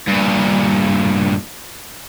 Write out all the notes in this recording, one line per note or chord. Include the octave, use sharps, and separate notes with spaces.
G2 A#2